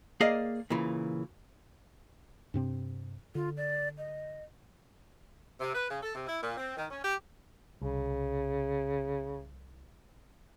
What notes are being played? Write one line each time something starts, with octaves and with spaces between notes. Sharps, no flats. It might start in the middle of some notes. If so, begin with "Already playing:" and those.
A#3 G#4 D5 D#5 F5
A#2 C#3 E3
G2 C3 C4
D3 F4
D5
D#5
C3
B4
C#3
A4
C3
E4
A#2
C4
D#3
C#4
G4
C2 C#3